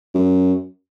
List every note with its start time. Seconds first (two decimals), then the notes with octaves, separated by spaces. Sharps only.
0.15 F#2